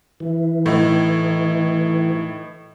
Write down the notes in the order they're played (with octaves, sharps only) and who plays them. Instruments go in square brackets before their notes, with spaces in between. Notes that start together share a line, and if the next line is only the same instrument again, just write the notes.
[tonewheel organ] E3
[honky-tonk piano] A2 D#4